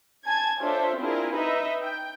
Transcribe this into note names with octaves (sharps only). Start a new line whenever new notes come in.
G#5 A5 G#6
D4 F4 A4 C5 C#5 E5
C4 D4 E4 F4 G#4 A#4
D#4 B4 D#5 E5
G5